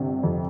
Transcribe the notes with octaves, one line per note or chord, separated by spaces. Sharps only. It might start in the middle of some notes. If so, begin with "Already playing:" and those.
Already playing: G1 C3
F2